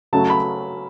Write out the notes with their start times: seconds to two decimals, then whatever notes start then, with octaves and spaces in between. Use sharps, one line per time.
0.13 C#3 F#3 A3 A5
0.30 B5